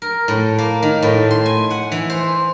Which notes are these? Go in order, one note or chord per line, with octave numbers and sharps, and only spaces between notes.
A#4
A2
A#3
D#3
A2
C6
G#5
F#5
E3
C5